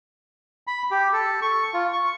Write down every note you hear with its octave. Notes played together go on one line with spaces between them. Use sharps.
B5
G4
A4
C#6
F4
C#6